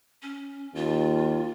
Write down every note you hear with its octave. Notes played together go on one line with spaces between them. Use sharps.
C#4
D#2 F4